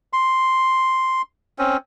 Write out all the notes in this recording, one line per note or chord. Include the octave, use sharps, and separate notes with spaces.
C6
C4 C#4